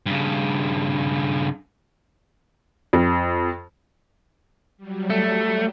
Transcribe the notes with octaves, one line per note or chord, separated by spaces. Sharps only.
G2 C#3
F2
F#3 G3
A3